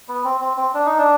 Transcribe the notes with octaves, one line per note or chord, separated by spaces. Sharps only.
B3
C4
C4
C4
D4
D#4
D4